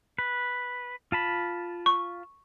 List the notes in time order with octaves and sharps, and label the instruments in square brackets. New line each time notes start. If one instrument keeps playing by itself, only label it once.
[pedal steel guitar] B4
F4 A5 B5
[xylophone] C#6